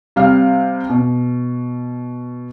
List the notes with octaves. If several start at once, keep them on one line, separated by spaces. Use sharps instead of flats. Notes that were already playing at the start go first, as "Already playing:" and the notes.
C3 G3 F5 F6
B2